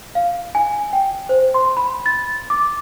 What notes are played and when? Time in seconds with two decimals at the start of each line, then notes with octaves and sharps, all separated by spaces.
0.15 F5
0.55 G#5
0.93 G5
1.29 C5
1.54 C6
1.77 B5
2.06 A6
2.50 D6